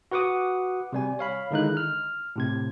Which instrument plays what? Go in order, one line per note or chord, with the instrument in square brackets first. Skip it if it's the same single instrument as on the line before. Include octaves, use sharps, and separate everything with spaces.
[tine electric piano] F#4 B4 F#5 D6 D#6
C3 G3 G#5
C#5 F5 B5
D3 D#3 G#3 D#4 E4 F#6
F6
A2 C3 G#6